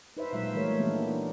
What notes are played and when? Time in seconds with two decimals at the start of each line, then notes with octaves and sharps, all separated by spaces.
0.17 D#4 B4 C5 E5
0.33 A#2 F#3 G#3 F4 E5
0.54 E3 G3 A3 A#4 C#5
0.77 E3 F3 G3 A#3 B3 D4
0.94 D#4